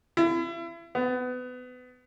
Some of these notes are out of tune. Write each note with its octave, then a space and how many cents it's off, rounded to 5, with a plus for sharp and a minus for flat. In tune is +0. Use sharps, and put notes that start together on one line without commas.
E4 +35
B3 +25